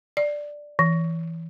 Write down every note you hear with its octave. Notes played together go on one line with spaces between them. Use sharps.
D5
E3